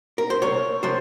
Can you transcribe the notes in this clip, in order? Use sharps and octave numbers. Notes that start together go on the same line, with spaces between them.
A#4
C5
C2 C#5
C3 F3 C5